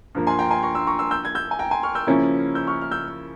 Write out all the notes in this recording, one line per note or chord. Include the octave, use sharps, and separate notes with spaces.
G2 F3 A#3
G#5 C6
G5 A#5
G#5 C6
A#5 C#6
C6 E6
A#5 C#6
C6 E6
E6 G6
G#6
E6 G6
G#5
G5 A#5
G#5 C6
C#6 F6
E6 G6
C#3 F3 A#3 C#4 E4
E6 G6
C#6 F6
F6
E6 G6